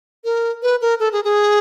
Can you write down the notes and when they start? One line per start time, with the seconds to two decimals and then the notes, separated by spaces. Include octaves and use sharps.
0.25 A#4
0.63 B4
0.81 A#4
1.00 A4
1.12 G#4
1.24 G#4